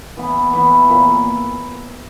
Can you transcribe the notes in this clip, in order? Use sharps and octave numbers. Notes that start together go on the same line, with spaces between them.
E3 B3 E4
E3 B3 E4
A#2 A#3 E4